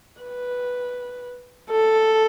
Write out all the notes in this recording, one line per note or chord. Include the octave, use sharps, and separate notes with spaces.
B4
A4